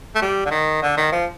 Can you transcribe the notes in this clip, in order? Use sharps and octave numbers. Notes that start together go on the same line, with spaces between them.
A3
G3
D3
D#3
D3
D#3
F3